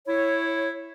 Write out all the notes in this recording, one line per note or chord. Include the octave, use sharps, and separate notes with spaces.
E4 C#5